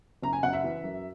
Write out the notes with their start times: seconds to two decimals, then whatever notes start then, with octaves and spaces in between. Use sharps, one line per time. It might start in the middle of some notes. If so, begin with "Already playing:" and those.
0.22 F#1 A#5
0.33 G#5
0.43 F#1 F#5
0.53 E5
0.64 E3
0.84 F#2